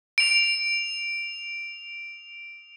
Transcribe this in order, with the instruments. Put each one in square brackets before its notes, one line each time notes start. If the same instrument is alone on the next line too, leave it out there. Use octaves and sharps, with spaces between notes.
[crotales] D7 F7